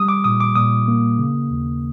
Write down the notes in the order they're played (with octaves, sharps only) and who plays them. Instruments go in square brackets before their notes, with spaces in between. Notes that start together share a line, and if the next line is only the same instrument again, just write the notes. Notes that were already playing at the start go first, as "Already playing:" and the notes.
Already playing: [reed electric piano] G3 D#6
D6
A#2 D#6
D6
A#2 D#6
A#3
C#3
D#2